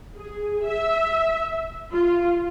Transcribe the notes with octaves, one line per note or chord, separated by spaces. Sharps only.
G#4
E5
F4